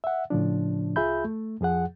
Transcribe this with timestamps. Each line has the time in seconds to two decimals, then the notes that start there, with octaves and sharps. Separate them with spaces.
0.04 E5 F#5
0.30 A2 C#3 F3 D4
0.96 C2 F4 G#4 E5 B5 G6
1.25 A3
1.61 F2 F3 G#4 F#5